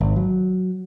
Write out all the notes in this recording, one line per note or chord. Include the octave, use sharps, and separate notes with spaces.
G#1
F#3